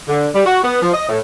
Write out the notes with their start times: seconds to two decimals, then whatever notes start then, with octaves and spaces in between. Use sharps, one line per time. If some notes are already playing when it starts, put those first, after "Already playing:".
0.08 D3
0.34 G3
0.46 F#4
0.64 B3
0.82 F3
0.93 D#5
1.08 A2